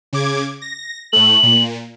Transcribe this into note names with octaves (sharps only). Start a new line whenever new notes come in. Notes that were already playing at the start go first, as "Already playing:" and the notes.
C#3 D6 G#6
A#6
A2 A3 F#7
A#2